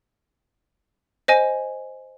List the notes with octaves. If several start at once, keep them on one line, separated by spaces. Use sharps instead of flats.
C5 D#5 G#5